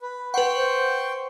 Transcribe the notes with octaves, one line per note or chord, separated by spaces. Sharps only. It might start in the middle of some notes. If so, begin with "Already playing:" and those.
B4
B4 F#5 G5 C6 C#6
C5